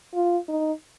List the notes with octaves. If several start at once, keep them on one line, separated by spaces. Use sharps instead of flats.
F4
D#4